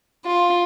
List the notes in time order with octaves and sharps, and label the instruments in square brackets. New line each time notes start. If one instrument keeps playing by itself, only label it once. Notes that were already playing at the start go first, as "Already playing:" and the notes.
[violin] F4